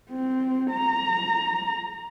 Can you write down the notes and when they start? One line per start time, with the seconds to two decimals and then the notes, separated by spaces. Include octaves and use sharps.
0.10 C4
0.72 A#5